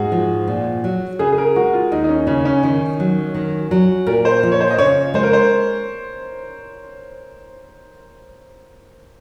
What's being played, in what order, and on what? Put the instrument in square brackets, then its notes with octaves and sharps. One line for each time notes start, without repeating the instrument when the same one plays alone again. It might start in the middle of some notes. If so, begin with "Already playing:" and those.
Already playing: [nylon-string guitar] G#2 [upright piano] D#4 F#4 G#4
[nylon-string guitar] F3
A#2
F#3
[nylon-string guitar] C#3 [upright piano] G#4
[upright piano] G#4
A#4
[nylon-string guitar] G#3 [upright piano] F#4
[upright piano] F4
[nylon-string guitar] D#2 [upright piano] D#4
[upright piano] D#4
C#4
[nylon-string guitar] C#3 [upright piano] C#4
[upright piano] C#4
[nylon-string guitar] D#3 [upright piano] C#4
[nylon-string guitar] F#3
D#3
F#3
[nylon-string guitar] A#2 [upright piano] A#4
[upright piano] C5
[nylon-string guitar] F3
[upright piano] C#5
C5
D#5
[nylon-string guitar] C#3 [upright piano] C#5
[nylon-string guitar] G#3 [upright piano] C5
[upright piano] A#4
C5